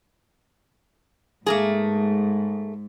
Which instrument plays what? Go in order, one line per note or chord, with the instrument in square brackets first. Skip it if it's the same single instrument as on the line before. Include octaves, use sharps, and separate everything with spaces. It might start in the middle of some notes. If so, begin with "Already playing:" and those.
[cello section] G#2 [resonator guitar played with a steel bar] A3 A#3 G#4